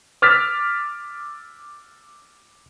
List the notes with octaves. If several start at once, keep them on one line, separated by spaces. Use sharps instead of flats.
D6 E6 F6 A6 B6